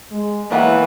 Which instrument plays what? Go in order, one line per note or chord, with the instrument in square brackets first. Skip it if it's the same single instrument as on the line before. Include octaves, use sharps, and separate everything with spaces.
[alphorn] G#3
[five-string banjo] D#3 F#3 B3 [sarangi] E3 [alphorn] A#3